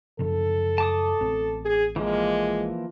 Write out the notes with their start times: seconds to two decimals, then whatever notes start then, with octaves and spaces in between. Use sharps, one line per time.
0.19 F#2 C#3 F3 A4
0.78 A5 D6 D#6
1.21 A1 B3 C4
1.65 G#4
1.96 E3 F3 G#3 A#3